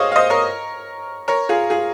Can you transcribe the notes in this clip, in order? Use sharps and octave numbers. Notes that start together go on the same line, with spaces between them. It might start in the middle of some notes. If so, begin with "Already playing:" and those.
Already playing: G#4 C5 C#5 D#5 F5
F5
C5 D#5
A#4 C#5
A#4 C#5
F4 G#4
F4 G#4